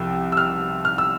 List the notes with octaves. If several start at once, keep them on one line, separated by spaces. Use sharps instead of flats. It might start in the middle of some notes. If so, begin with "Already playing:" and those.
Already playing: C2 C3 F3 G5 E6
E6
F6
F6
E6